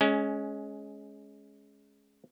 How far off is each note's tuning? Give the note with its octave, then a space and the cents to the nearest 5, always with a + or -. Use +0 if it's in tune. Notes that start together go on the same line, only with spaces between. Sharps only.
G#3 +15 C#4 +0